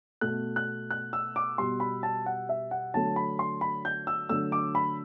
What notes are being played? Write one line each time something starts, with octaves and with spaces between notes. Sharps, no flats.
B2 A3 F#6
F#6
F#6
E6
D6
B2 G3 C6
B5
A5
F#5
E5
F#5
D3 F#3 A3 A5
B5
C6
B5
G6
E6
D3 F#3 A3 E6
D6
B5